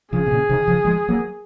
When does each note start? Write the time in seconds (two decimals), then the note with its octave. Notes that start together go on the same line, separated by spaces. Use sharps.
0.13 C#3 F3 G#4
0.26 C3
0.31 A#2 C#3
0.49 C3 D#3
0.67 C#3 F3
0.85 F3 G#3
1.09 F#3 A#3